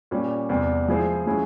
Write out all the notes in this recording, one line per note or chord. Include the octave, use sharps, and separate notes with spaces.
A#2 G3 C#4
E2 C3 G3
F3 G#3 E4 G#4 C5
F3 G#3 C#4 E4 G#4